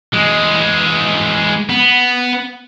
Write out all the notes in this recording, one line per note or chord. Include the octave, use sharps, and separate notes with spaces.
E3 G#3
B3